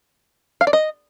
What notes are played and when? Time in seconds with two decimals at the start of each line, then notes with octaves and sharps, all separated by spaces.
0.61 F5
0.67 D5
0.73 D#5